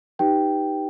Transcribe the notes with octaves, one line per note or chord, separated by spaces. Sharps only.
D#4 G4 B4 G5